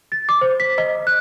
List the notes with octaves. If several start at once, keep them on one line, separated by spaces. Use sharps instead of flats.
A6
D6
C5
B6
D#5
F#6